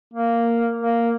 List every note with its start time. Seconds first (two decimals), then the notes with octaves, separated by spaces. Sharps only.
0.13 A#3
0.81 A#3